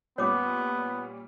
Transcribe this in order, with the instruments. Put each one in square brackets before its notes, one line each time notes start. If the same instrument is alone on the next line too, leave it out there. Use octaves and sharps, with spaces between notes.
[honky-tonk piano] A#2 G3 C#4 [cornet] B3 [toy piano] C#5 D6